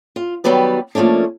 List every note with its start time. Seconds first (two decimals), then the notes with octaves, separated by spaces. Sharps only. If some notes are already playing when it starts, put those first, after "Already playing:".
0.16 F4
0.44 D#3 F#3 G3 B3 B4 D5
0.95 F3 A3 A#3 C#4 D4